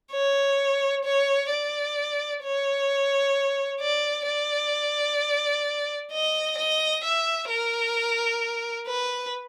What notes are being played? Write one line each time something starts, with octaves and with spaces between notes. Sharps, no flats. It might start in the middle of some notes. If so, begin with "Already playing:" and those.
C#5
C#5
D5
C#5
D5
D5
D#5
D#5
E5
A#4
B4